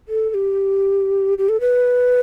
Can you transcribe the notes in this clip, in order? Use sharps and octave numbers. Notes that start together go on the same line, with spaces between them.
A4
A4
G4
G4
A4
B4